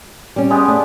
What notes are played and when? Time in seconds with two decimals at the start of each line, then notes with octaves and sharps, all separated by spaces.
0.36 G3 C#4
0.50 G#3 B3 G4
0.68 A3 D4